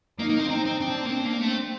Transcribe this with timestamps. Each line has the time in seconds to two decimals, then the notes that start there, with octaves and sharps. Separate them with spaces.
0.19 A#3 D#4
0.29 A#3
0.39 C4
0.49 C4 D#4
0.65 C4
0.80 C4 D4
1.06 A#3
1.11 C4 D4
1.25 A#3
1.41 A3 C4